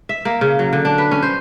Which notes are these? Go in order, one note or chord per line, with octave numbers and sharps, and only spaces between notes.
E5
A#3
C#3
F#3
D3
D4
B4
C#4
C5